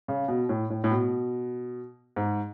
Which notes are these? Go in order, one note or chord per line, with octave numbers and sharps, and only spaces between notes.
C#3
B2
A2
A2
A2
B2
G#2